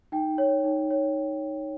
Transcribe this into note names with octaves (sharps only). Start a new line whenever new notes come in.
D#4 G5
C#5
D#4
C#5